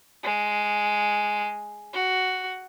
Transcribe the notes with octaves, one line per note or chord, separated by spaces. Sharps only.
G#3
F#4